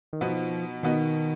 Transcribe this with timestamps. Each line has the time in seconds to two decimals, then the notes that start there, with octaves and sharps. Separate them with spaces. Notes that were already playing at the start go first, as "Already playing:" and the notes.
0.13 D#3
0.21 B2 F3 B3 D#4
0.83 B2 D#3 B3 D#4